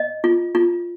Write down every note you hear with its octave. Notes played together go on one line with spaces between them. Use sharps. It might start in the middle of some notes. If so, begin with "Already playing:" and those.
Already playing: D#5
F4
F4